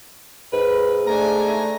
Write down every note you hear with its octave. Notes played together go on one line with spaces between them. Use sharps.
G#2 B4
A3 D4 G#5 A#5